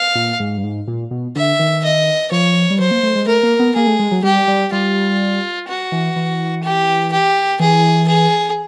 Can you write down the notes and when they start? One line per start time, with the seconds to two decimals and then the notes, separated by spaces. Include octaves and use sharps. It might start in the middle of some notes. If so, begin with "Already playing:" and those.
Already playing: F5
0.15 A#2
0.40 G#2
0.57 G2
0.64 G#2
0.88 A#2
1.11 B2
1.36 D3 E5
1.59 D#3
1.83 D#5
2.31 F3 C#5
2.70 G3
2.80 F#3 C5
2.91 A#3
3.03 A3
3.15 G#3
3.27 A3 A#4
3.43 A#3
3.59 B3
3.75 A#3 G#4
3.87 A3
3.99 G#3
4.11 F#3
4.23 G3 G4
4.48 G3
4.72 G3 F4
5.68 F#4
5.92 E3
6.16 E3
6.63 G4
7.12 G4
7.60 E3 G#4
8.07 G#4